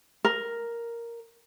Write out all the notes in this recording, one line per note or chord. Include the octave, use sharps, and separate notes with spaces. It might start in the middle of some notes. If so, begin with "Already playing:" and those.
A#4